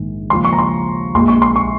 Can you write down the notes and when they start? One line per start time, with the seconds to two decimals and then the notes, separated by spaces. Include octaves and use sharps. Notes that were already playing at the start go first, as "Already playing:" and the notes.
Already playing: A#1 G#2 D#3 G#3
0.30 D#2 C#3 F3 G#3 C6
0.45 C#6
0.53 A#5
0.59 C6
1.15 A#1 A#2 G#3 C6
1.28 C#6
1.42 C6
1.56 C#6